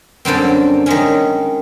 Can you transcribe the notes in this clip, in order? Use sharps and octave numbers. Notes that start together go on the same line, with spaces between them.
F#2 D3 G3 C4
D#3 G#3 C#4